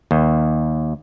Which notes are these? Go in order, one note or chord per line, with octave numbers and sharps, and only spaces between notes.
D#2